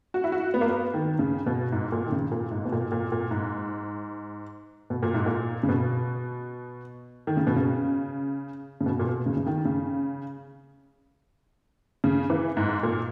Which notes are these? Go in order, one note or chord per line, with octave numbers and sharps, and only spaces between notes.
F#4
E4
F#4
B3
A#3
B3
D#3
C#3
B2
G#2
A#2
D#3
C#3
A#2
G#2
B2
A#2
A#2
A#2
G#2
B2
A#2
G#2
A#2
C#3
B2
D#3
C#3
B2
C#3
C#3
B2
A#2
B2
C#3
C#3
D#3
C#3
C#3
E3
G#2
A#2